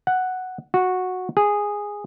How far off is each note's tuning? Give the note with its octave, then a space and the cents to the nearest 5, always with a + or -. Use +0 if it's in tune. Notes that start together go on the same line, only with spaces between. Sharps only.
F#5 +0
F#4 -10
G#4 -10